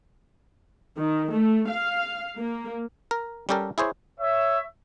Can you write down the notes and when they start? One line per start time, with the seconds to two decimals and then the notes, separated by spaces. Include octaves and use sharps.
0.97 D#3
1.33 A3
1.68 F5
2.37 A#3
3.11 A#4
3.49 G3 C#4 G4 A4 A#4
3.78 E4 G#4 C5 C#5
4.20 C#5 E5